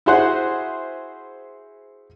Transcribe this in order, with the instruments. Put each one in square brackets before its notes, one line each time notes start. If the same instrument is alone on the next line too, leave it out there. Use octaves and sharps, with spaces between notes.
[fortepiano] E4 F#4 G#4 C5 F#5